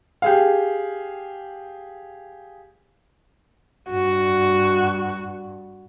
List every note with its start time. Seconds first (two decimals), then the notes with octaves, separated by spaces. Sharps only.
0.22 G4 G#4 F5
3.90 G2 F#4